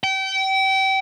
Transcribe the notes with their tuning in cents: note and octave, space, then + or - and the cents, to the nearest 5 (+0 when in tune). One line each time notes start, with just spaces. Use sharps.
G5 -30